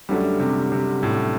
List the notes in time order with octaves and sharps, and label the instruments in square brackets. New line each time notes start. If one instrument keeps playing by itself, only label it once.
[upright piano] F#2 D3 F#3 A3 [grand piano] G3
[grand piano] C3
C3
A2